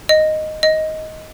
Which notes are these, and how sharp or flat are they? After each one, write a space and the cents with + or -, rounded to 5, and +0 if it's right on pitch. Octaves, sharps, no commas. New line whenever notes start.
D#5 -5
D#5 +10